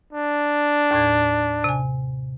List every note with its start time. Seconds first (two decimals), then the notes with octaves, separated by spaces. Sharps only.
0.13 D4
0.91 D#2 A2 G#6
1.64 C3 G#5